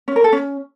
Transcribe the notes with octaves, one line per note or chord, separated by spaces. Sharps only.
C#4
A#4
A4
C#4